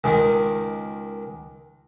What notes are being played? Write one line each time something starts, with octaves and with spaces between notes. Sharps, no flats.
C#2 D#3